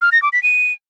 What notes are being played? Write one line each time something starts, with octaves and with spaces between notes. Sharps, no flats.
F6
A#6
D6
B6
D#7